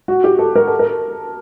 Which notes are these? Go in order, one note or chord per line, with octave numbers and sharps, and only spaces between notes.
F#4
G4
A4
A#4
A4
A#4